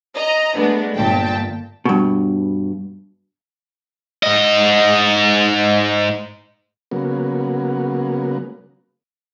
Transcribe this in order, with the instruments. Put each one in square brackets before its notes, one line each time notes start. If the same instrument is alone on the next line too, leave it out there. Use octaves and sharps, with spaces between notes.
[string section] D#5 A#5
G#3 A3 B3 D4
G1 A#2 G5 A5
[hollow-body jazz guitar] G2 B2
[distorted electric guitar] G#2 D#5
[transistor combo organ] C#3 F#3 A#3 B3